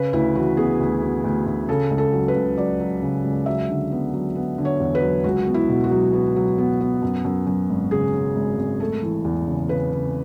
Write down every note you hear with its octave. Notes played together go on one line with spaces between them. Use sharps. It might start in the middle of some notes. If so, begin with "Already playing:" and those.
Already playing: C#3 B4
D2 E4
E3 F#4
B3 G#4
D2
B3
D2
D2
C#3 A4
C#2
A4
F#3
B4
C#2
F#3 D5
F#3
C#3
C#2
F#3 E5
D3
B3
F#3
B3
D3
C#5
E2
B4
F#3
C#2 F#4
B3
E4
B2
F#4
F#3
B3
F#3
B3
B3
F#2
F#2
F#2
G#1
C#3 G#4
C#3
G#1
G#1
A3 A4
E3
E2
C#3
C#3 B4
C#3